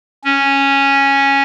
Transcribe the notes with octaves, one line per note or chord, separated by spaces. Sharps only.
C#4